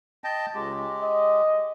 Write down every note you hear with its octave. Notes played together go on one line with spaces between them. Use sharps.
D#5 G5 A5
C#2 G#3 G4
D#5